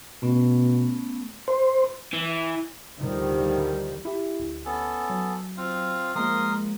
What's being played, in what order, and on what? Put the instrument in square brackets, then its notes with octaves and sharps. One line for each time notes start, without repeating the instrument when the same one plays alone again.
[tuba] B2 [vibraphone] A3 B3 C#4
[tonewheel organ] C5
[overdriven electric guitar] E3
[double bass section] D2 D#3 F3 G3
[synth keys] E4 G4
D2
[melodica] B3 C#4 A4
[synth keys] F#3
[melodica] C4 F4 F5
[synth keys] F3 G#3 A#3 [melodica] A#4 C6 D#6